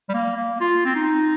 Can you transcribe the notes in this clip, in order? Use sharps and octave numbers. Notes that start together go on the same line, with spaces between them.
G3
A#3
A#3
F4
C4
D#4